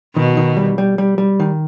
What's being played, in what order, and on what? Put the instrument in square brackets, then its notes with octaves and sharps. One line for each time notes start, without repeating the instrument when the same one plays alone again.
[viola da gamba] B2 [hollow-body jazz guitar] D#3
[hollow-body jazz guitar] D#3
G3
G3
G3
G3
D#3